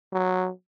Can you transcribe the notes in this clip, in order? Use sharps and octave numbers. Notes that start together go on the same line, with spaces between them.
F#3